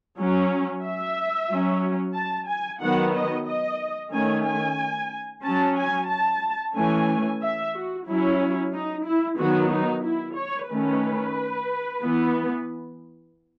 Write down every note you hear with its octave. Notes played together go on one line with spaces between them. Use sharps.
F#3 C#4
E5
F#3 C#4
A5
G#5
D#3 F#3 B3 F#5
D#5
D#5
D#3 A3 C#4 G#5
G#5
F#3 C#4 A5
G#5
A5
E3 A3 C#4 G#5
E5
F#4
F#3 C#4 E4
D#4
E4
D#3 F#3 B3 F#4
D#4
E4
C#5
D#3 A3 C#4 B4
E3 B3